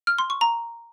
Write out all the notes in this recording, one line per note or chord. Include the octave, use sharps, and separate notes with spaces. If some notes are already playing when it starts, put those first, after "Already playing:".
F6
C6
C#6
A#5